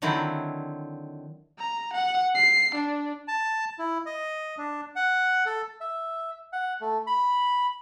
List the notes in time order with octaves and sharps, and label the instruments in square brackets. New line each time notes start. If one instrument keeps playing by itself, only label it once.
[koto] D3 D#3 F#3 C4 E4
[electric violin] A#5
F#5
C7
D4
[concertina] A5
E4
D#5
D4
F#5
A4
E5
F#5
A3
B5